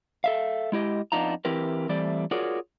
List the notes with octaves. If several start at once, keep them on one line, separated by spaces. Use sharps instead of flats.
A4 E5 F5
G#3 E4 G4 D#5
F2 B3 D4 D#4 F4 A#5
E3 C4 E4 G4 A#4 B4
E3 G3 A3 C4 D5
F4 F#4 G#4 A#4 C#5 D5